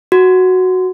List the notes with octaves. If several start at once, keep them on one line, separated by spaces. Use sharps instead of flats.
F#4